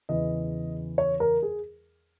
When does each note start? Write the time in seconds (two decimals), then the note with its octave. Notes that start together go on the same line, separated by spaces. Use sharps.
0.09 E2 C#3 E3 D#5
0.98 C#5
1.20 A#4
1.43 G#4